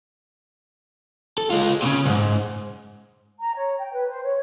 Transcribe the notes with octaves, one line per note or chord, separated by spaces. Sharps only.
A4
G#3 F4
A#2 C#3
B1 G#2
A#5
C#5
G5
B4
C5
C#5